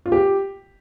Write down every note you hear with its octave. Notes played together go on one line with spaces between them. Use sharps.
F4
G4